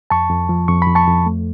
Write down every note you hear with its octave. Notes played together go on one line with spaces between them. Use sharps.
F2 A5 C#6
F2
F3
F2 C#6
B5
F2
A5 C#6
F2
A3